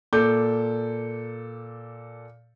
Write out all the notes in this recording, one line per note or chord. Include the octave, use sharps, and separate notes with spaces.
A#2 A4 D6 G6